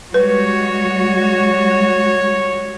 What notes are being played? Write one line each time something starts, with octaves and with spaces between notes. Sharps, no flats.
G3 G#3 F#4 B4 C#5